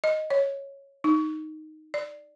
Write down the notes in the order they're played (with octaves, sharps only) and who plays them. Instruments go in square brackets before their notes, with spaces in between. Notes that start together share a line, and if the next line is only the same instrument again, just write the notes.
[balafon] D#5
C#5
D#4
D5